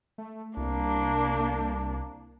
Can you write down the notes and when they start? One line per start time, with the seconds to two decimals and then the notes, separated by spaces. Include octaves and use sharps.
0.18 A3
0.57 C2 A#3 D4